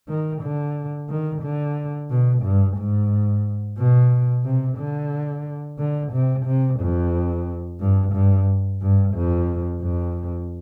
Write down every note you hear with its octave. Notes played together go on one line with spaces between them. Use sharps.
D#3
D3
D#3
D3
B2
G2
G#2
B2
C3
D3
D3
C3
C3
F2
G2
G2
G2
F2
F2